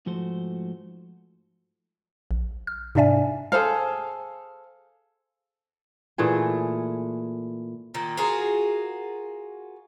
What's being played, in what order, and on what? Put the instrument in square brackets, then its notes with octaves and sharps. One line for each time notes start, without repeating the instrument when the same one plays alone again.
[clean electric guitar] G#2 F3 A3 F#4 C5
[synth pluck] A#1
F6
G#2 C3 D4 D5 E5 G#5
[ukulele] G#4 A4 C5 F5
[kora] A#2 E3 A3 G#4
[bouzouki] A#2 D#3
F4 F#4 G#4 A#4